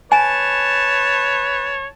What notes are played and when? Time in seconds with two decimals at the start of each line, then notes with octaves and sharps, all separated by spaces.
0.12 B4 C#5 G#5 A5